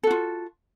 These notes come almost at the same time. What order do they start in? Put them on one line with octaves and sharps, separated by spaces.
A4 F#4 F4